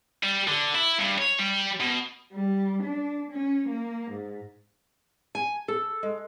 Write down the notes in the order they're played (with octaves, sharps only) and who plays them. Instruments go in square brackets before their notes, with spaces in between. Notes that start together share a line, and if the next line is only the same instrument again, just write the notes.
[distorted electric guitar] G3
D3
E4
G2
C#5
G3
B2
[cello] G3
D4
C#4
A#3
G#2
[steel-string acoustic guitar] G#5
A4
G#3